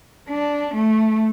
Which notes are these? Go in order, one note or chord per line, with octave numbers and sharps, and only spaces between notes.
D4
A3